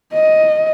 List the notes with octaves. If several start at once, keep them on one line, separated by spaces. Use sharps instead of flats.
D#5